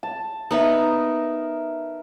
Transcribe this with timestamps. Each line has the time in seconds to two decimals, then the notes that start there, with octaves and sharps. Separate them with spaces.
0.03 A5
0.51 B3 D#4 A#4 E5